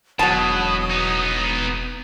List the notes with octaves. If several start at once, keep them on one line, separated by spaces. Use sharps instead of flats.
E1 B2 F#3 A5 D#6
B3 D#4